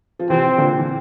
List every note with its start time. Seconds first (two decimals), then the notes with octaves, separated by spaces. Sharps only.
0.19 F3
0.30 C3 E3 C4
0.58 A#2 D3
0.78 E3